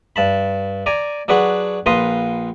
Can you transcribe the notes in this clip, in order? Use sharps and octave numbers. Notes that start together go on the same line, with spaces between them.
G2 A5 B5
D5 G#5 A#5
F#3 D4 G#4 B4 C#5 F#5
A#1 F4 B4 A#5 C6 D#6